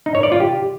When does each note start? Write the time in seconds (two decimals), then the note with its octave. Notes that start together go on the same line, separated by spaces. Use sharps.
0.06 D#4
0.15 C#5
0.23 D5
0.32 F4
0.40 G4